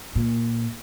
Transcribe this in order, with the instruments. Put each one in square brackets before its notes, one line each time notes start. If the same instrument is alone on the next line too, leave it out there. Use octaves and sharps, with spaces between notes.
[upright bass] A#2